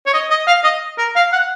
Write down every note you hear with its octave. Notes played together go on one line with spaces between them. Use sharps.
C#5
D#5
D#5
F5
D#5
A#4
F5
F#5